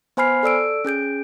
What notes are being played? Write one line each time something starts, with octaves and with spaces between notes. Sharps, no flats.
B3 C5 G#5 B5 F6 C7
A4 D5 E6 D7
C#4 G#4 G6 D7